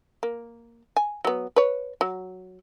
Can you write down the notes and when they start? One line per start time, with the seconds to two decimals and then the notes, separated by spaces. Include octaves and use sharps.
0.23 A#3
0.97 G#5
1.25 F#3 B3
1.56 B4 C#5
2.01 F#3